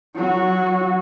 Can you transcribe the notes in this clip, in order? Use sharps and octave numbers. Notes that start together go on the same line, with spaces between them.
F#3 F#4